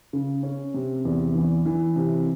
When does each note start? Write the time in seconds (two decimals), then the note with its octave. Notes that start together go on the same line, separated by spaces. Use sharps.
0.13 C#3
0.43 C#4
0.74 C3
1.05 E2
1.35 E3
1.66 E3
1.96 C3